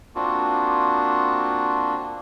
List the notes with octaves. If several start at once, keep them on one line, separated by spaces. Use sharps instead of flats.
A#3 C4 D4 F4 F#4